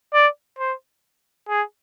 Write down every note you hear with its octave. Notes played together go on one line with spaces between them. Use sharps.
D5
C5
G#4